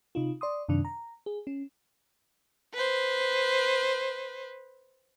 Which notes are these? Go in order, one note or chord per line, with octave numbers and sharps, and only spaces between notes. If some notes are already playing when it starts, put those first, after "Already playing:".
C3 D#4 F4
D5 C6 D#6
F#2 C3 D#3 D4
A#5
G#4
C#4
B4 C5